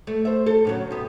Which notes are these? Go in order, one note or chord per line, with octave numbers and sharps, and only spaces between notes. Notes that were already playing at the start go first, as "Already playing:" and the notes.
A3
C5 E5
A4
A2 C#3 F#3
C3 B3